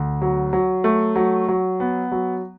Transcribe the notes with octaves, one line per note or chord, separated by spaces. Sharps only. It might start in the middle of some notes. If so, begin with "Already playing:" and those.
Already playing: D2
F#3
F#3
A3
F#3
F#3
B3
F#3